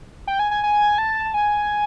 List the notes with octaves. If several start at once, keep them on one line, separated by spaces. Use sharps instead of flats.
G5
G#5
G#5
G#5
A5
G#5